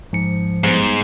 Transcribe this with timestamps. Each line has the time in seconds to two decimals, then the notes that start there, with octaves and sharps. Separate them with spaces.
0.13 G#2 F3 C#7
0.64 G#2 G3 B3 C5